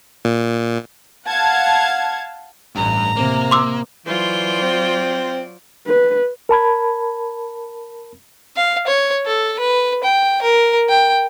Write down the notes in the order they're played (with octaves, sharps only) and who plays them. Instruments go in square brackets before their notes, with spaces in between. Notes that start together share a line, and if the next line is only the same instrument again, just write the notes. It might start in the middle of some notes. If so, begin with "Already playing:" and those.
[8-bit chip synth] A#2
[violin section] F5 F#5 A5 G#6
[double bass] A1 [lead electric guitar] G2 [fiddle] A#5
[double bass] C3 [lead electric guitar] A#3
[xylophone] C6 D6 E6
[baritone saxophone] E3 [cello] F#3 D5 [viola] F4 C5
[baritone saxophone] C4
[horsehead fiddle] B4
[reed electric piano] A#4 A5 B5 G#6
[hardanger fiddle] F5
C#5
A4
B4
G5
A#4
G5